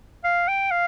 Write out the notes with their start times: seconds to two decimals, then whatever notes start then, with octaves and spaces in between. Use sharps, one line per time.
0.24 F5
0.48 G5
0.71 F5